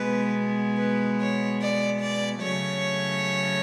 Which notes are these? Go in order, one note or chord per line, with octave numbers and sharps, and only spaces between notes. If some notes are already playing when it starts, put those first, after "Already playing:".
Already playing: B2 G#3 B3 B4
B4
C#5
D5
D5
C#3 F#3 A3 C#5